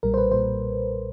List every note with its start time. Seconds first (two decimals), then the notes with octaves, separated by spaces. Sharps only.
0.03 B1 A#2 G3 A#4
0.14 C5
0.18 B4
0.32 B1 A#2 G3 C5